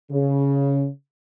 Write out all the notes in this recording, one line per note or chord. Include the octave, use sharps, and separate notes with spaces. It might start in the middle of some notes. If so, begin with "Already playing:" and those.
C#3